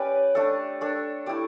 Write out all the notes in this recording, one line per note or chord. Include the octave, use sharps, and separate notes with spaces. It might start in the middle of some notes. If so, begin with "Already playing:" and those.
Already playing: C#4 G4 B4 D5
A3 D4 A4
D4 A4 C#5
A3 E4 G4 D5